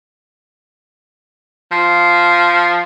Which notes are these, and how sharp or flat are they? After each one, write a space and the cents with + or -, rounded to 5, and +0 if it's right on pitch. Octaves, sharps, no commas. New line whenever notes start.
F3 -5